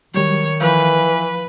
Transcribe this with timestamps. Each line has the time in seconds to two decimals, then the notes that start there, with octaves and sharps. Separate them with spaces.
0.14 D#3 F#3 G3 C#5
0.60 E3 F3 B4 F5 G6